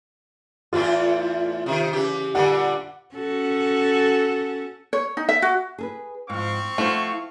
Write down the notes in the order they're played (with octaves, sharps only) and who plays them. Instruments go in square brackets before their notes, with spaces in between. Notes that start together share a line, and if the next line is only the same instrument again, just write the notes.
[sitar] E2 A2 E4 [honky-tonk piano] F4
[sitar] C3 D#3
C#3 E3 G4
[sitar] A#2 D3 G3 [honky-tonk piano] F#5 D6
[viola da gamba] C#4 F#4 A4
[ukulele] C#5
D#4
E5
F#4
[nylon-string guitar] G#4 A4 B4
[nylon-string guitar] G#2 F3 [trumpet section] C4 F5 C#6
[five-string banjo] F3 A3 [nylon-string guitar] E4 F#5